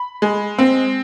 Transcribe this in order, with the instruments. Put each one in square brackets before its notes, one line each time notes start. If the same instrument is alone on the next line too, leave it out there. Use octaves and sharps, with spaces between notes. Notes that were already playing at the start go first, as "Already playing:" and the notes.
Already playing: [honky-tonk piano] B5
G#3
C4